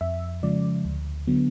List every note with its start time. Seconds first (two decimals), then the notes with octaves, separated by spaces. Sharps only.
0.01 F2 E5
0.43 C#3 F3 G#3 D5
0.85 D2
1.27 D3 F#3 B3